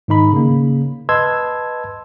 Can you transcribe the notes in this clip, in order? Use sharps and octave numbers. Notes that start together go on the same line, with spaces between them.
G#2 D#3 D#4 B5
C#3 A#3
B4 D#5 A5 C6 E6 G#6